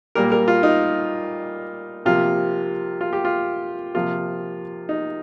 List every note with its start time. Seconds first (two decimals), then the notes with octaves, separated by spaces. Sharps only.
0.15 A#2 G3 A#3 A#4
0.32 A#4
0.48 F4
0.63 D#4
2.06 C3 F3 A#3 F4
3.01 F4
3.13 G4
3.25 F4
3.94 C3 F3 A#3 F4
4.89 D#4